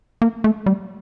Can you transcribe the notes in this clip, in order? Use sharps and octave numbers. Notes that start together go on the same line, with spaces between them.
A#3
A3
G3